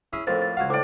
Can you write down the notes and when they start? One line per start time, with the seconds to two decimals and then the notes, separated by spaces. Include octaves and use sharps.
0.13 C#4 E4 G#4
0.27 F2 A2 A#3 C5 A6
0.42 A6
0.57 C#2 F#4 F5 F#5 G#6
0.70 A2 C5 D5 D6